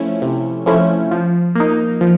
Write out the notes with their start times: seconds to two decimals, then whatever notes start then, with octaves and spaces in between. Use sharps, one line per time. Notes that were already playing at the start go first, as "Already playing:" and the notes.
Already playing: F3 A3 C#4 E4
0.22 C3
0.66 F3 A3 C#4 E4
1.11 F3
1.55 A#3 D#4
2.01 F3